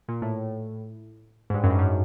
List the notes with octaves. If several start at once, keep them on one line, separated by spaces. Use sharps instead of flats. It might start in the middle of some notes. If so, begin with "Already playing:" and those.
A#2
A2
G#2
G2
F#2
G2
F#2